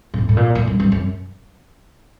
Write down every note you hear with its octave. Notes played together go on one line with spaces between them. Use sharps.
A#2
A2
A2
A#2
A2
G2
G2
F#2